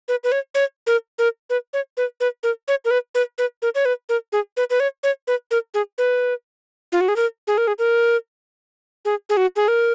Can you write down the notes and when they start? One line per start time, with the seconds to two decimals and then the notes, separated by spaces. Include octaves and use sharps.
0.08 B4
0.24 B4
0.32 C#5
0.55 C#5
0.87 A#4
1.19 A#4
1.50 B4
1.73 C#5
1.97 B4
2.20 B4
2.43 A#4
2.68 C#5
2.85 A#4
2.91 B4
3.15 B4
3.38 B4
3.62 A#4
3.75 C#5
3.85 B4
4.09 A#4
4.32 G#4
4.57 B4
4.70 B4
4.80 C#5
5.03 C#5
5.27 B4
5.51 A#4
5.74 G#4
5.98 B4
6.92 F4
7.01 F#4
7.08 G#4
7.16 A#4
7.47 G#4
7.58 A#4
7.67 G#4
7.79 A#4
9.05 G#4
9.29 G#4
9.37 F#4
9.56 G#4
9.68 A#4